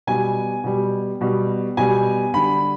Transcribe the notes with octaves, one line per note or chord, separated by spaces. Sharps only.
B2 G3 G#5
B2 G3
B2 G3
B2 G3 G#5
D3 G3 B5